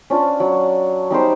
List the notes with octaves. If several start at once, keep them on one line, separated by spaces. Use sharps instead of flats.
C#4 D4 F4
F#3
G3 D#4 G4 C5